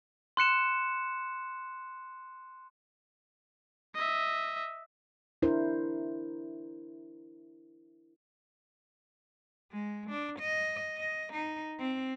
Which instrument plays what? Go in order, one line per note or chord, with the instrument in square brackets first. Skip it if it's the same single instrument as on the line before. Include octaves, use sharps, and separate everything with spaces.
[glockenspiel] C6 F#6 C#7 E7
[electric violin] D#5 E5
[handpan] D4 E4 A#4 C5
[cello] G#3
D4
D#5
D#5
D#4
C4